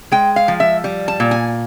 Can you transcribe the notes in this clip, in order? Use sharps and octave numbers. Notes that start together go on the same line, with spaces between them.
G#3 G5
F5
F3
E5
G3
A5
A#2
G#5